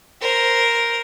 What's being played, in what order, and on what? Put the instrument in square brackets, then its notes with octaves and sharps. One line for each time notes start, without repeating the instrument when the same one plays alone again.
[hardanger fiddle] A#4 C5